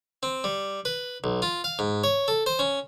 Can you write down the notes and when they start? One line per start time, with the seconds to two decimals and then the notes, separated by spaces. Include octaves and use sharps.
0.23 C4
0.44 G3
0.85 B4
1.24 B1
1.42 F4
1.64 F5
1.79 G#2
2.04 C#5
2.28 A4
2.46 C5
2.59 C#4